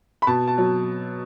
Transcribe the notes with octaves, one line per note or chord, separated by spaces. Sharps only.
B5
B2 A5
A5
F#3